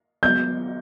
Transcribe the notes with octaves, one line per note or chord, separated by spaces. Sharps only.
F#3 B3 G6